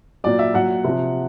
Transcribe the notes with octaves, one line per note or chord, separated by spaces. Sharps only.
A#2 F#3 D5
E5
A#2 F#3 F#5
C3 F3